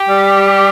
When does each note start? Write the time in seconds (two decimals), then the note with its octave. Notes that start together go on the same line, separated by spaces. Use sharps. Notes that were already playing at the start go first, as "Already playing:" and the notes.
Already playing: G4
0.09 G3